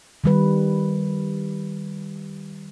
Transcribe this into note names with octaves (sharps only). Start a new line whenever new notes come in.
D#3 G3 B4